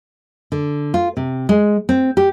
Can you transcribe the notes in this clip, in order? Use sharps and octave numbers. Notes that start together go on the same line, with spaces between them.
D3
F4
C3
G#3
C4
G4